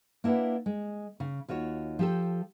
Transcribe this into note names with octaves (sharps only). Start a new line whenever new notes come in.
A#3 D4 E4 B4 F#5
G#3
C#3
D#2 F4 F#4 C#5
F3 G4 A4